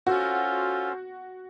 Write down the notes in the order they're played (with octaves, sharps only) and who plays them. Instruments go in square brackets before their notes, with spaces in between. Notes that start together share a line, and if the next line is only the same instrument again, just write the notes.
[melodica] C#4 F4 A4 C5 [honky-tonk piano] F#4